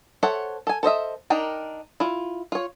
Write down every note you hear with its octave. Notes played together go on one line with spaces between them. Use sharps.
A4 C5 C#5 E5 F#5
A4 G#5
A4 C5 D#5 E5
D4 D#4 A#4 G5
E4 F4
F4 C#5